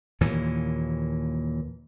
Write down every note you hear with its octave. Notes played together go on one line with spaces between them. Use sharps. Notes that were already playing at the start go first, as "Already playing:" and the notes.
D#2 A#2 E3